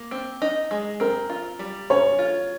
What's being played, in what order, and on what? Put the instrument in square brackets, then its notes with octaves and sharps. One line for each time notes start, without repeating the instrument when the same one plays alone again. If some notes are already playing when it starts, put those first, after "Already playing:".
Already playing: [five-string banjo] A#3
C4
D#4
G#3
[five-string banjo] C4 [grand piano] A#4
[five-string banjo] F4
G3
[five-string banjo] C#4 [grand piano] C#5
[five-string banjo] F4